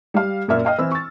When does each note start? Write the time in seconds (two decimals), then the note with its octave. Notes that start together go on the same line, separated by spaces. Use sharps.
0.14 G3 F5
0.48 F#2 A#2 A#3 D5 E5 F6
0.65 D#5 F5 G5
0.78 E3 C4 E4 E6
0.91 C#6 A6